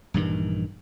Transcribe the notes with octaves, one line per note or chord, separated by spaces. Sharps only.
A#1 G2 D#3 E3